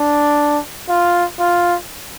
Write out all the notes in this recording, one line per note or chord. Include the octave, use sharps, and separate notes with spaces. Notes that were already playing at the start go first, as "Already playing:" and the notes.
Already playing: D4
F4
F4